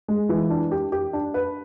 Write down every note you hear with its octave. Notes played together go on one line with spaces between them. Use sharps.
G#3
E3
D4
G4
G4
D4
B4